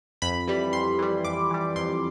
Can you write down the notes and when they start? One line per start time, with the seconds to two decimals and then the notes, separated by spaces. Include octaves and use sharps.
0.22 F2 B5
0.48 E3 G3
0.73 F2 C6
0.99 E3 G3
1.24 F2 D6
1.51 E3 G3
1.76 F2 C6